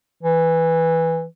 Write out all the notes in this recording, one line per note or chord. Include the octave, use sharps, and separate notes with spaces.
E3